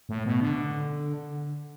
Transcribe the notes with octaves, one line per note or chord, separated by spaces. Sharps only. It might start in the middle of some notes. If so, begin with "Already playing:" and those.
A2
B2
D3